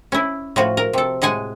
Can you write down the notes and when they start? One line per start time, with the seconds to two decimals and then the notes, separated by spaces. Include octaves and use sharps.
0.12 C#4 E4
0.56 A2 F3 F#4
0.77 A#4
0.93 C3 A4
1.22 A2 G#3 F#5 G#5